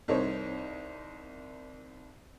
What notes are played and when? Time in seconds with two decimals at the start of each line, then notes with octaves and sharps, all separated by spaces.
0.08 C2 D#4 A#4 C5 C#5